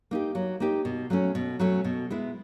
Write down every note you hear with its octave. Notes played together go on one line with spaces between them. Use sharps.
A#3 D#4 G4
F#3
A#3 D#4 G4
B2
F#3 A3 C#4
B2
F#3 A3 C#4
B2
G#3 B3 E4